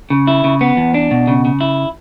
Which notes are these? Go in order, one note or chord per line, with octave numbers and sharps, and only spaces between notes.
C#3
E4
C#3
B3
E2
D4
B2
C#3
C#3
E4